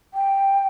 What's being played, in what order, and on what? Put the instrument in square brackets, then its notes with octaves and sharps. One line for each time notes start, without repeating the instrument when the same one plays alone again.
[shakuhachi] G5